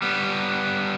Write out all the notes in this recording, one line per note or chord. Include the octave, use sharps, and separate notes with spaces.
G3 B3